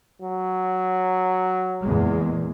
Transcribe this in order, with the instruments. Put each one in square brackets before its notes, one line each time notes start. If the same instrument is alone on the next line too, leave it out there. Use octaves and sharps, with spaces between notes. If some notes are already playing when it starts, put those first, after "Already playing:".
[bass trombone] F#3
[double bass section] E2 A#2 G#3